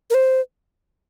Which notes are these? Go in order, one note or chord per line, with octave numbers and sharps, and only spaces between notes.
A#4
C5